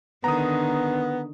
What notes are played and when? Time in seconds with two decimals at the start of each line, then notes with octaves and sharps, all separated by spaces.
0.24 D3 D#3 B3 A#5 D#6